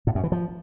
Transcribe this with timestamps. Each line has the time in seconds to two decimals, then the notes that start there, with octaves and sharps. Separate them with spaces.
0.07 A2
0.15 F#2
0.23 E3
0.32 F3